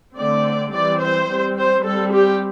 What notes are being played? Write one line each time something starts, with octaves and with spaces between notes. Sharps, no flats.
D3 A3 C4 D5
E3 G3 C4 D5
C5
G3 C4
C5
G3 C4 A4
G4